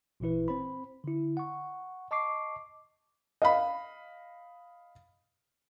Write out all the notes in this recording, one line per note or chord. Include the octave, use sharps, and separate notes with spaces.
G#1 A#2 E3 E4 B4
C4 C5 B5
D3 E4
F#5 C#6
D#5 A5 C#6 D6 C7
D#5 F5 B5